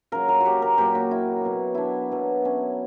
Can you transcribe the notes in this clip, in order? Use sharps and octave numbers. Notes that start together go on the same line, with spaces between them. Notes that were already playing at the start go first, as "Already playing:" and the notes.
C#3 F#3 A#4
A#4
F#4
G4
A#4
A#2 F#3 G4
F#4
E4
B2 F#3
D4 E4
B2 F#3
C#4